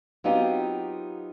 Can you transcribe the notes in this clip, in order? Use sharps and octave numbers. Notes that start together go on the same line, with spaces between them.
F#3 B3 C4 D#4 F4 G4